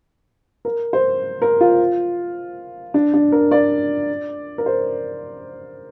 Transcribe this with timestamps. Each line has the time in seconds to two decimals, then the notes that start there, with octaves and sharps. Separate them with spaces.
0.65 A#4
0.93 C5
1.42 A#4
1.61 F4
2.94 D4
3.14 D4
3.32 A#4
3.51 D5
4.58 A#4
4.66 C5